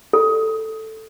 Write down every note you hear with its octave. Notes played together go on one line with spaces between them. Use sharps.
A4